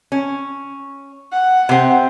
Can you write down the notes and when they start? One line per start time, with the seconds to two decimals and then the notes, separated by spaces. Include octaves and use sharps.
0.12 C#4
1.32 F#5
1.69 C3 C4